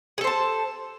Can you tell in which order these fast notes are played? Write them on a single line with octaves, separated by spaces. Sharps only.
G#4 A4 C5 A5